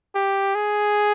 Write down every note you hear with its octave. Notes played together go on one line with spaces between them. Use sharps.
G4
G#4